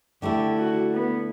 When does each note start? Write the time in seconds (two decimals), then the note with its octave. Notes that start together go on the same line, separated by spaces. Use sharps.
0.22 D3 A3 E4 G4
0.58 F#4
0.93 B3